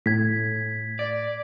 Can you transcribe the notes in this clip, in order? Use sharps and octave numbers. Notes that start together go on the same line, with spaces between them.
A2 G#6 B6
D5